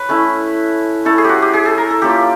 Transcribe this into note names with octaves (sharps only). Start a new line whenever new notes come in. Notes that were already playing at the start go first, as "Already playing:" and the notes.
Already playing: B4 C#5
A3 C#4 E4
A3 C#4 E4 A4
G#4
F#4 G4
G4
G#4
A4
A#4
A4
A#3 C#4 F4 G4